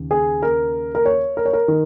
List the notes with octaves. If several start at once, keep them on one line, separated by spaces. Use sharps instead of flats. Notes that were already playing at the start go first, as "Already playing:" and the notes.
Already playing: D#2 C#3
G#4
A#4
A#4
C#5
A#4
C#5
A#4
D#3